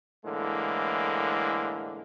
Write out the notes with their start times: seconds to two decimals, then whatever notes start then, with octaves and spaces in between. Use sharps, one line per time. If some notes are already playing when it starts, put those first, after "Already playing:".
0.24 A2 D3 E3 G#3 A#3